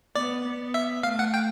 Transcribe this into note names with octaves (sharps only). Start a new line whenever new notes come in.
B3 D5
B3
E5
A3 F5
F#5
G5